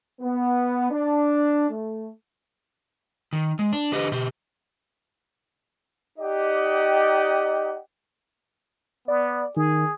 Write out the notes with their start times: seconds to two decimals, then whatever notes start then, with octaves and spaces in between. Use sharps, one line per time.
0.21 B3
0.91 D4
1.70 A3
3.33 D#3
3.59 G#3
3.73 D4
3.92 D3 G4 B4 D#5
4.12 B2 G4
6.19 D#4 G4 D5 D#5 F#5 G5
9.08 B3 D5
9.57 D#3 G#4